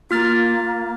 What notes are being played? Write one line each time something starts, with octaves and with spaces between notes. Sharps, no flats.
A#3 F4 F6 A6